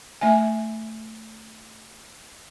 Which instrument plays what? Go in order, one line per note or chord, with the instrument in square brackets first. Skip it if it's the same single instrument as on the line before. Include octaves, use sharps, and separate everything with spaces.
[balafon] A3 E5 G#5